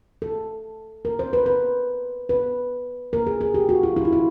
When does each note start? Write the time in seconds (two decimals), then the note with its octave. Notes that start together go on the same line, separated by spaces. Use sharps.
0.22 A4
1.05 A#4
1.19 C5
1.33 B4
1.46 B4
2.29 B4
3.13 A#4
3.27 G#4
3.41 G#4
3.54 G4
3.69 F#4
3.83 F4
3.96 E4
4.05 F4
4.13 E4